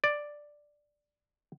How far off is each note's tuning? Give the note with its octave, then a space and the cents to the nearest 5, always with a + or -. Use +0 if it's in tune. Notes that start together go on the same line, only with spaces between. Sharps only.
D5 +5